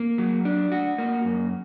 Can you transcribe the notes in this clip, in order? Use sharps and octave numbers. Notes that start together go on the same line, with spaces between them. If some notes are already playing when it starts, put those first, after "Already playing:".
Already playing: A#3
F#3
D4
F#4
A#3
F#2